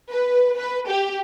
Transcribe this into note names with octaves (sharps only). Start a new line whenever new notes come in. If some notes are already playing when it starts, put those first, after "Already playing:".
B4
B4
G4